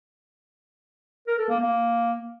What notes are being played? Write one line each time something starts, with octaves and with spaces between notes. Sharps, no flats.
A#4
A4
A#3
A#3